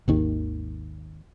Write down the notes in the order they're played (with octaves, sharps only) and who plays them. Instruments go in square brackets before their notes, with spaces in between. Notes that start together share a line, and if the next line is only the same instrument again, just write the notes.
[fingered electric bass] G#1 D#2 D#3